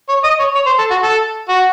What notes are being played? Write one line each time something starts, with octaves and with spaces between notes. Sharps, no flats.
C#5
D#5
C#5
C#5
C5
A4
F#4
A4
F#4